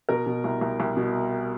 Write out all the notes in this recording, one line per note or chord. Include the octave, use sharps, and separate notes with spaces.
B2 A#4
B2
C2
C2
C2
B2